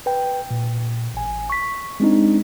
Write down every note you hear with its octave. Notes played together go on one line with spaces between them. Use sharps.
B4 G5
A#2
A1 G#5
C#6 B6
G#3 C4 D4 D#4